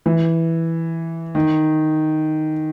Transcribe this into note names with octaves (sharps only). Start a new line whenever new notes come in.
E3
D#3